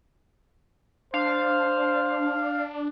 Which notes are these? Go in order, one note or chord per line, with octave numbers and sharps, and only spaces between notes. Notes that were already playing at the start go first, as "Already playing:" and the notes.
D4 C5 F5